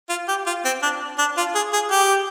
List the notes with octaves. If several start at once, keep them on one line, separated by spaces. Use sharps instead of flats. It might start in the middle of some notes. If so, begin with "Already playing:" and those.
F4
G4
F4
C4
D4
D4
F4
G#4
G#4
G4